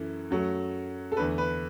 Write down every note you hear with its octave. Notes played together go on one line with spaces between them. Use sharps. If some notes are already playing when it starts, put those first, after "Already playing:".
Already playing: F#2 E3 A3
F#2 F#3 A3
A4
E2 D3 A3 B4
B4